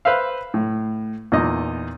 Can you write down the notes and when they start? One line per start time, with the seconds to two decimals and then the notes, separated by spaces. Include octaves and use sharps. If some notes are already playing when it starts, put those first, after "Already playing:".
0.05 B4 C5 E5 F5
0.54 A2
1.32 E2 A#2 D#4 D#5